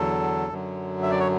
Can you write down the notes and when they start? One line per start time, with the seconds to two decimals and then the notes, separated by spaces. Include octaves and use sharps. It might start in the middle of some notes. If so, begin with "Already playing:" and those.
Already playing: E2 D3 F#3 A4
0.49 F#2 D3 F#3
1.03 E5
1.11 D5
1.19 C#5